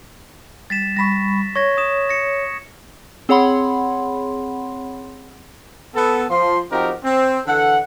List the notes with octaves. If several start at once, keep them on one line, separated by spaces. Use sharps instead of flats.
G3 A6 B6 E7
G3 B5 C#6 A#6 B6
C#5 C#6 G#6 A#6
D#6 E7
A#6 C#7
C4 G#4 C#5 F#5 B5 C6
B3 A4
F3 C6
F3 C4 D#4 F#4 G4 A#4
C4
D3 E3 A4 F#5